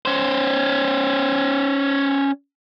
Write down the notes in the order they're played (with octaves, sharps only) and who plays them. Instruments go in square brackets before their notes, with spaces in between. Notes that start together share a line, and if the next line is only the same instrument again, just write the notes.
[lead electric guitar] C#4 C5